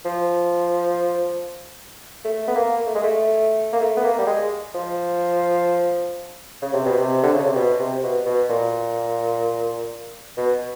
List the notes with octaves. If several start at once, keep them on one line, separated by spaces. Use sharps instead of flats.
F3
A3
B3
A#3
A3
G#3
A3
A#3
A3
B3
A#3
G3
G#3
F3
C#3
C3
B2
C3
D3
C#3
C3
B2
C3
B2
B2
A#2
B2